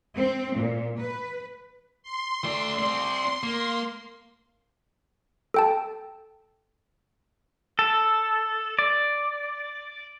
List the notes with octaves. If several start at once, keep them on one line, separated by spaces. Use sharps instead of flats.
C4
A#2
B4
C6
A3 D5
C4 D5
A#3
A4 G5 A5
A4
D5